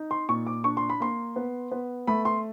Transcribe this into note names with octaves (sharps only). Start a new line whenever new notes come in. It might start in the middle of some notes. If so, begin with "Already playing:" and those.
Already playing: D#4
C6
A#2 C#6
D6
D4 C#6
C6
B5
A#3 C6
B3
B3
A3 B5
C6